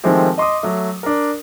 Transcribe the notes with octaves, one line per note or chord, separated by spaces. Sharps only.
D#3 F3 G#3 A3 C4 G4
D#5 C6 D6 D#6
F#3 A3
D4 A#4